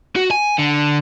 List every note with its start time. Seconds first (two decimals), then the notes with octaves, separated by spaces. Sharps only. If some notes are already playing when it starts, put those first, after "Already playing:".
0.16 F#4
0.31 G#5
0.58 D3